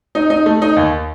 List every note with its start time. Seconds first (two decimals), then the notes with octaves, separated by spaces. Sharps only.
0.15 D#4
0.30 D#4
0.46 A3
0.62 D#4
0.76 D#2